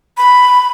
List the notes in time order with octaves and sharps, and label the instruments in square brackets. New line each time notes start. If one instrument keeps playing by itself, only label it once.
[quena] B5